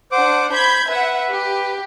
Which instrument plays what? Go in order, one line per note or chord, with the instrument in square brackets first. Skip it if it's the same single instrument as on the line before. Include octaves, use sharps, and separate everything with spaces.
[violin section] D4 F#5 [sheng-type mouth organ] C5 D6
[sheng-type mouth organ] C5 [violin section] B5 G6 G#6
[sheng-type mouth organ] B4 [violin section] E5 F#5
[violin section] G4